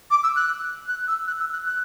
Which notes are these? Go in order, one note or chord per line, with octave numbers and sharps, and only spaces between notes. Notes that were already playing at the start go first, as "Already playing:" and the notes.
D6
E6
F#6
F#6
E6
F#6
E6
F#6
F#6